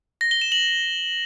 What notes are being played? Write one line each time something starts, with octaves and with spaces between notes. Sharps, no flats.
A#6
G7
E7
F#7